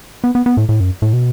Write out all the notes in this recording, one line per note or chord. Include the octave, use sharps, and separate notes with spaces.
B3
B3
B3
A2
A2
F#2
A2
B2